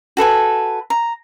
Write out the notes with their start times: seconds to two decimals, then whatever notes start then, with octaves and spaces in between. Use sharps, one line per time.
0.17 F#4 A4 B4 G#5
0.90 A#5